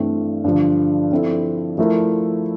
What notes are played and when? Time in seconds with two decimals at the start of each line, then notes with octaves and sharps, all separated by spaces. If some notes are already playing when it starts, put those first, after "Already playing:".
Already playing: G2 E3 A3 C4
0.44 G2 D3 F3
1.11 F3 C4 E4 A4
1.78 F3 A3 E4 A#4